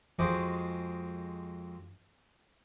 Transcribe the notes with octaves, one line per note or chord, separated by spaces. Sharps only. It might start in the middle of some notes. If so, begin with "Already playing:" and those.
F2 G#3 F#4 C5 C#6 D6